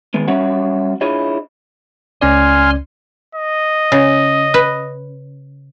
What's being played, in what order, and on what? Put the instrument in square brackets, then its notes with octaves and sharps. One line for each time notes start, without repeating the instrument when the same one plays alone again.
[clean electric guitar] D#3 G#3 B3
G3 C#4 F#4 C#5 E5 F#5
D4 E4 F4 G#4 C#5 D#5
[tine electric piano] C#2 C#4 D5 [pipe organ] G#5 C6 F6
[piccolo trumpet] D#5
[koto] C#3
B4